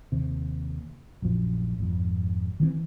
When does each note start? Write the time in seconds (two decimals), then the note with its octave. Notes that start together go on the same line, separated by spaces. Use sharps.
0.12 D#2 C3
1.22 A#1 F#2 F3
1.78 G#1 F2
2.60 D#3 E3 B3 C4